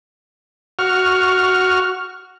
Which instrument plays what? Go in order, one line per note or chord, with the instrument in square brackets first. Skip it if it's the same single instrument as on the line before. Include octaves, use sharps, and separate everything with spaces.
[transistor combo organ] F#4 C#6 F6